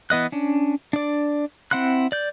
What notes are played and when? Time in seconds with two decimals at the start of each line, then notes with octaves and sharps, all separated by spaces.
0.10 E3 B3 D#5 F#6
0.32 C#4 D4
0.93 D4 D5
1.71 C4 E4 F#5 C6 F#6
2.12 D5 G6